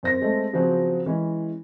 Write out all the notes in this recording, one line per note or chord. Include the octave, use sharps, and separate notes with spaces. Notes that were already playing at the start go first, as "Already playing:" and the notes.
F#2 C4 A#6
G#3 A3 C4 A4
C#3 F3 F#3 C4 F#4 G#4
E3 G#3 C#4